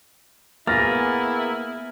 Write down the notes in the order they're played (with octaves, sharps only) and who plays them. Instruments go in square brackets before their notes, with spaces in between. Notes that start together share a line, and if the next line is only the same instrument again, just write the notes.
[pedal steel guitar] A#3 B3 G#4 [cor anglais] E4 [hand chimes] F6 [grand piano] A6 A#6